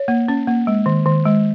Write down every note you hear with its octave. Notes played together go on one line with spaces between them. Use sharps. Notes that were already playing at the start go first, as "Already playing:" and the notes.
Already playing: C#5
A#3
C#4
A#3
G#3
D#3
D#3
G#3